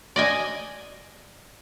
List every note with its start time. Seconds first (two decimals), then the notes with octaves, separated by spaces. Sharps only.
0.16 D5 D#5 G#5